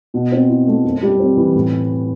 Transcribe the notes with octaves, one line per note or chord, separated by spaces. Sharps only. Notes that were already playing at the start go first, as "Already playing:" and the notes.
B2
C4
E4
A3
F#2
G3
C4
E3
A2